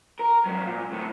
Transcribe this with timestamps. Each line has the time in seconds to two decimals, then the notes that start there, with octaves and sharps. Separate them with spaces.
0.19 A#4
0.46 G#2 F#3
0.66 A#2
0.91 D2 A2